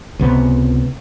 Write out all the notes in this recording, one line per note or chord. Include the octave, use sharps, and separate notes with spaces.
C#2 C3 B3